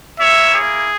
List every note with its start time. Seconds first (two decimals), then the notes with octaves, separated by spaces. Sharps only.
0.20 A#3 E4 C#5 E5
0.55 G#4